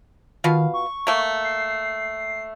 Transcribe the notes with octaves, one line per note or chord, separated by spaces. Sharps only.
B2 D#3 F4 F5
C#6
A3 A#3
C7